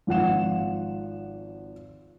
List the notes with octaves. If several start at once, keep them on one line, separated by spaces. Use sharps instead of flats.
G#1 F3 F#5 E7